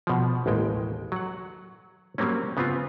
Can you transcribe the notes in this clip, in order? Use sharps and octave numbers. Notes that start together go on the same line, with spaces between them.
B2 F3
A1 D#2 G#3 G5
F#3 F#5
F#3 G3 A#3 C4 C#4
C#3 B3 C4 F4